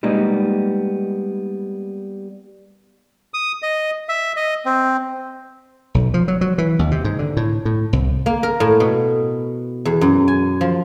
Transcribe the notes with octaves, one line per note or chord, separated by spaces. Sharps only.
G3 G#3 A#3 B3 D#4
D#6
D#5
E5
D#5
C4
B1
F3
F#3
F#3
E3
D#2
C3
G#2
D3
A2
A2
C2
A#3
A#4
A2
B2
E2
F#2
G#5
F3